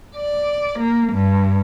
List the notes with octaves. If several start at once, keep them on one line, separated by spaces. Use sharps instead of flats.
D5
A#3
G2